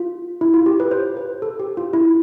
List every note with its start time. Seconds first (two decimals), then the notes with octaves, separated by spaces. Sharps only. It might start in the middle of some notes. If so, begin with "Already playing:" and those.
Already playing: F4
0.41 E4
0.54 F4
0.66 G4
0.80 B4
0.91 C5
1.17 B4
1.42 A4
1.60 G4
1.77 F4
1.93 E4